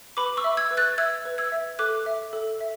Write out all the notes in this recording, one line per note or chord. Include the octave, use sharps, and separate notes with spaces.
B4 B5 D6
C#6 E6
E5
E6 G#6
B4
F#6 A6
E5 E6 G#6
B4
E6 G#6
E5
A4 D6 F#6
E5
A4
E5